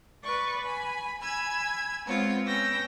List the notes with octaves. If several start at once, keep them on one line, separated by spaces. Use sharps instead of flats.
B4 D5 C#6
G#5 B5
G#5 B5 E6 G#6
G#3 B3 C4 F4 C#5
B3 C#4 G5 E6 A#6